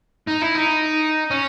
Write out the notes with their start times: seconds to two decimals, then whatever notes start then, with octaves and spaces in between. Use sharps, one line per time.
0.27 D#4
0.42 E4
0.55 D#4
1.31 C#4